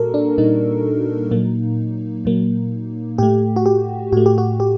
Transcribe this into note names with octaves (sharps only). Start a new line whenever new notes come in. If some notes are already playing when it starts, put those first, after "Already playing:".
Already playing: A#2 G3 A#3 F#4 A4 A#4
D4
A#2 G3 A#3 D#4
A#2 F#3 A#3
A#2 F#3 A#3
A2 A3 G4
F#4
G4
A2 A3 F#4
G4
F#4
G4